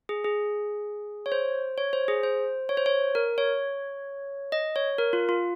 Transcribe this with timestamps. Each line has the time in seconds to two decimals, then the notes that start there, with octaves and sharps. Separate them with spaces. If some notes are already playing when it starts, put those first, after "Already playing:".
0.09 G#4
0.24 G#4
1.26 C#5
1.32 C5
1.78 C#5
1.93 C5
2.08 G#4
2.23 C5
2.69 C#5
2.77 C5
2.86 C#5
3.15 A#4
3.38 C#5
4.52 D#5
4.76 C#5
4.98 A#4
5.13 F4
5.29 F4